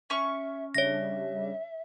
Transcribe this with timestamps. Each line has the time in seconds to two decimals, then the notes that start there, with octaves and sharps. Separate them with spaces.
0.10 C#4 E5 C#6
0.75 C#3 G3 D4 C#5 E5 A#6